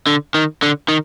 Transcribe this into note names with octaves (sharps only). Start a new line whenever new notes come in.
D3
D#3
D3
D#3